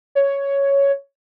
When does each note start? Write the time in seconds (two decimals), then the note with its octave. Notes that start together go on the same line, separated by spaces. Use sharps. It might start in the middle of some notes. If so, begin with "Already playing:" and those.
0.15 C#5